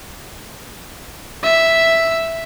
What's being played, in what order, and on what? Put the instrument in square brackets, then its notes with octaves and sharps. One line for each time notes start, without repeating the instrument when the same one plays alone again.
[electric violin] E5